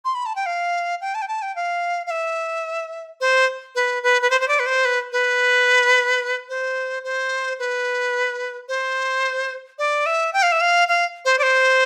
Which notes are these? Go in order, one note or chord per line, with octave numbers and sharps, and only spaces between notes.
C6
B5
A5
G5
F5
G5
A5
G5
A5
G5
F5
F5
E5
C5
B4
B4
B4
C5
C5
D5
B4
C5
B4
B4
C5
C5
B4
C5
D5
E5
G5
F5
E5
F5
F5
C5
D5
C5